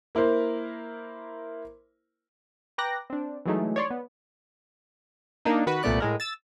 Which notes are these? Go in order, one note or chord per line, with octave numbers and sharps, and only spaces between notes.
A#3 E4 A#4 C5
B4 G5 A#5 D6 F#6 A#6
C4 D4
E3 F#3 G#3 A3 D#4
C#5 D5 C6
B3
A#3 D4 D#4
D#3 F#4 B4
C2 A#2 A3 B3 D5 F#6
A2 G#3 A#4
E6 A6